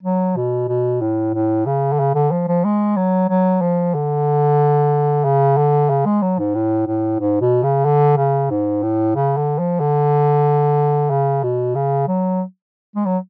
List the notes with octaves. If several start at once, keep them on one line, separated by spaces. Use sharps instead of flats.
F#3
B2
B2
A2
A2
C#3
D3
C#3
D3
F3
F3
G#3
F#3
F#3
F3
D3
C#3
D3
C#3
G#3
F#3
G#2
A2
A2
G#2
B2
C#3
D3
C#3
G#2
A2
C#3
D3
F3
D3
C#3
B2
C#3
F#3
G#3
F#3